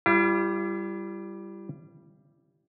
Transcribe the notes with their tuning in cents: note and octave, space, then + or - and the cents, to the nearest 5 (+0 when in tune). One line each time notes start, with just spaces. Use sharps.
G3 +0 E4 +45